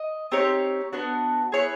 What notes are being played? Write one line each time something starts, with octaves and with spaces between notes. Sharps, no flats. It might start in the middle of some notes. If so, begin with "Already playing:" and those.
Already playing: D#5
C4 D#4 G4 C#5
B3 D4 F#4
B3 E4 G#4 C#5